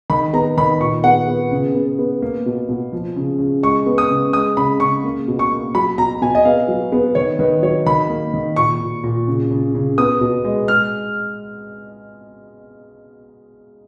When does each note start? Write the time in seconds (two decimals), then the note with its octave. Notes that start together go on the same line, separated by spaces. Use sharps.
0.10 D#3 B5
0.33 B3 A#5
0.57 D#3 B5
0.81 A#2 C#6
1.04 B3 F#5
1.28 B3
1.51 C#3
1.75 B3
1.99 B3
2.22 A#3
2.46 B2
2.69 B2
2.92 F3
3.16 C#3
3.39 C#3
3.63 G#3 C#6
3.86 B3
3.98 D#6
4.11 C#3
4.33 G#3 D#6
4.57 C#3 B5
4.80 C#3 C#6
5.04 A#3
5.28 B2
5.39 C#6
5.51 A#3
5.75 F#3 B5
5.98 B2 A#5
6.22 B2 G#5
6.35 D#5
6.45 B3 F5
6.68 F#3
6.92 B3
7.15 D#3 C#5
7.39 D#3 B4
7.63 F#3 C#5
7.86 D#3 B5
8.09 A#3
8.34 D#3
8.56 A#2 C#6
8.80 A#2
9.04 A#2
9.28 C#3
9.51 C#3
9.75 C#3
9.98 B3 D#6
10.21 B2
10.45 G#3
10.68 G#3 F6